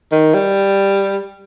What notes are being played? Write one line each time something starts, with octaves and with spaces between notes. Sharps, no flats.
D#3
G3